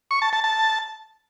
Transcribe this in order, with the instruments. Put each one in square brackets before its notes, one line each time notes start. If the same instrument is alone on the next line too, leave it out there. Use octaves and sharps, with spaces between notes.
[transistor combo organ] C#6
A5
A5
A5